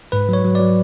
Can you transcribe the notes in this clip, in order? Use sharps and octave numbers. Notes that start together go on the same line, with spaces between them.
G#2 B4
F#3 C#5
F#3
F#3 D5